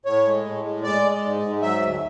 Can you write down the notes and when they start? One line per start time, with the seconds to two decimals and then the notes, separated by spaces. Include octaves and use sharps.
0.06 A2 C#5
0.25 G#3
0.44 A2
0.64 G#3
0.83 G#3 D5
1.03 G#3
1.23 G#2
1.42 G#2
1.62 F#3 E5
1.81 D2